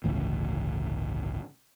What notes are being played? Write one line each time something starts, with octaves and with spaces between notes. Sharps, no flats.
G1 C#2 A2 E3